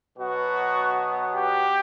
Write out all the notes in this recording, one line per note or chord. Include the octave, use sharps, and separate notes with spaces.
B2 F#3 B3 F#4
G4